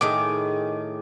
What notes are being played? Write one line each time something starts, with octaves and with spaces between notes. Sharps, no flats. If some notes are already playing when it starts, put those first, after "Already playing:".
A2 D#3 G#4 D6